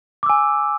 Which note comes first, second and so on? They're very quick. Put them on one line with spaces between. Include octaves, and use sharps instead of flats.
D6 E6 G#5